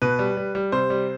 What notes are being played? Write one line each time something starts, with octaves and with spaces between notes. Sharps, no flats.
B2 B4
G3
G3
G3
C3 C5
G3